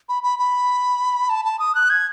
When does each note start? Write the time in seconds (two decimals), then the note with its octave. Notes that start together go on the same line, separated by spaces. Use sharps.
0.09 B5
0.23 B5
0.39 B5
1.29 A5
1.45 A5
1.59 D#6
1.75 F#6
1.90 G#6